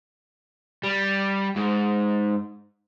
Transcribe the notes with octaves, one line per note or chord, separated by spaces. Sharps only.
G3
G#2